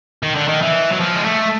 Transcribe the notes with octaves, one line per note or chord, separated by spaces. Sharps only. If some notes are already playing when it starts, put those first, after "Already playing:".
D#3
D3
D#3
E3
F#3
F3
G#3
A3